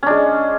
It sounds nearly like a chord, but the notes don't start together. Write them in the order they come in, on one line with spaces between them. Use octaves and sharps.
C#4 D4 G#3